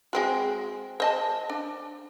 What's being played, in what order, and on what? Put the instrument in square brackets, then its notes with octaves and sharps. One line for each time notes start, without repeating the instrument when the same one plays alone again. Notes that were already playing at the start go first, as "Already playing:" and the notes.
[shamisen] G#3 C4 F#4
C5 D#5 A5
D4